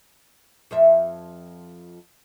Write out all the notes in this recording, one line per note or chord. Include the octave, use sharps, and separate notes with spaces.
F2 F3 E5